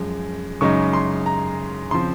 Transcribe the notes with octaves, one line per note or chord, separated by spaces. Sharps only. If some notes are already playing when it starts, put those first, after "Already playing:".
Already playing: F#2 F3 G#3
F#2 C#3 G#3 D#4 C#6
C6
A#5
C#3 F3 C4 C6